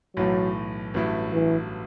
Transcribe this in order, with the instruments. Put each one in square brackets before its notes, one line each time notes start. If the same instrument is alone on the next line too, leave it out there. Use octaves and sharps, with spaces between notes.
[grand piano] B1 A2 E3 A3 [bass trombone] F#3
[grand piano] A1 G2 F#3 A3 E4
[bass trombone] E3